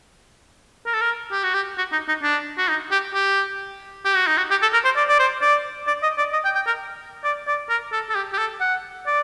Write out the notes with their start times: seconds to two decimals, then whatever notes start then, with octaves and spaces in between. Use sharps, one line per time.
0.86 A#4
0.93 A4
1.01 A#4
1.32 G4
1.43 F#4
1.54 G4
1.78 F#4
1.92 D#4
2.08 D#4
2.23 D4
2.58 F#4
2.68 D#4
2.91 G4
3.14 G4
4.05 G4
4.16 F#4
4.27 D#4
4.38 F#4
4.51 G4
4.62 A4
4.73 A#4
4.85 C5
4.96 D5
5.08 D5
5.19 C5
5.41 D5
5.87 D5
6.03 D#5
6.18 D5
6.33 D#5
6.45 G5
6.55 G5
6.67 A#4
7.24 D5
7.47 D5
7.70 A#4
7.92 A4
8.09 A4
8.15 G4
8.33 G4
8.38 A4
8.61 F#5
9.07 D5